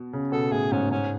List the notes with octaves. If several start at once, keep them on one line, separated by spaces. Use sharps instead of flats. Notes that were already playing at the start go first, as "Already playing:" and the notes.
Already playing: B2
C#3
B2 A4
A2 G#4
G#2 C#4
G#2 C#4